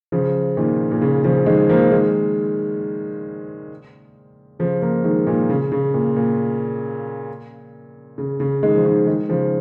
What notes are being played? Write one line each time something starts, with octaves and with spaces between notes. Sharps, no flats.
C#3 F3
A#2 D#3
A#2
C#3
C#3 F3
D#3 G#3
F3 A#3
D#3 G#3
C#3 F3
F3 A#3
D#3 G#3
A#2 D#3
C#3
C#3
A#2
A#2
C#3
C#3
D#3 G#3
F3
D#3 G#3
D#3 G#3
C#3 F3